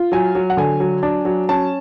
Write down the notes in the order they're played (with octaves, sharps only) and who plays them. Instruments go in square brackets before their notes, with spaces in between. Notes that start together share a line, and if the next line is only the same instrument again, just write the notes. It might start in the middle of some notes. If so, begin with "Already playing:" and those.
Already playing: [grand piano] F4
F#3 G#5
F#3
F#5
D3 G#5
F#3
D4
F#3
C#4 A5